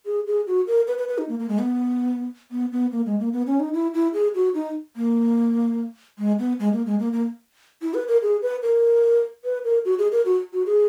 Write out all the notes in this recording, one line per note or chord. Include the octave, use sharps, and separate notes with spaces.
G#4
G#4
F#4
A#4
B4
B4
B4
D#4
A#3
A#3
G#3
B3
B3
B3
A#3
G#3
A#3
B3
C#4
D#4
E4
E4
G#4
F#4
D#4
A#3
G#3
B3
G#3
A#3
G#3
A#3
A#3
E4
B4
A#4
G#4
B4
A#4
B4
A#4
F#4
G#4
A#4
F#4
F#4
G#4